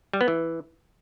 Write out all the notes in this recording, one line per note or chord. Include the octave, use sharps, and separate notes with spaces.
G3
B3
E3